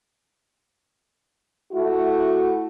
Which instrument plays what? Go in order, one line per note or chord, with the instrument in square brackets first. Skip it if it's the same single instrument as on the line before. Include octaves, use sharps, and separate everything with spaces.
[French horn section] A3 E4 F#4